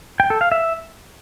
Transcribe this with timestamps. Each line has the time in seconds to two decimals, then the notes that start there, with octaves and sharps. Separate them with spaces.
0.20 G5
0.30 A4
0.41 F5
0.52 E5